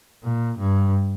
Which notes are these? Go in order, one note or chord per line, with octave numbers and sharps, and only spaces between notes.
A#2
G2